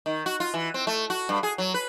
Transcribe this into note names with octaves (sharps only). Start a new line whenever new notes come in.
D#3
F#4
F4
E3
C4
A3
F#4
G2
G#4
F#3
B4